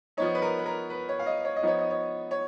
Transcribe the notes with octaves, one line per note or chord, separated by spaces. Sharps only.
F3 B3 D#4 C#5
B4
A#4
B4
A#4
B4
C#5
F5
D#5
C#5
D#5
F3 B3 D#4 C#5
D#5
C#5
C#5